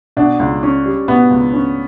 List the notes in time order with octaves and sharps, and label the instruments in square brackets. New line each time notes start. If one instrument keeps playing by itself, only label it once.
[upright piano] B2 [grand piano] D4
[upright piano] C#2
C#4
G3
[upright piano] B2 [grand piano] B3
[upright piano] C#2
C#4